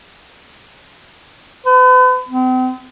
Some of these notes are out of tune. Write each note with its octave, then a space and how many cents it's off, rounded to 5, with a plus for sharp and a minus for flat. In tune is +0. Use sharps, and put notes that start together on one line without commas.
B4 +40
C4 -40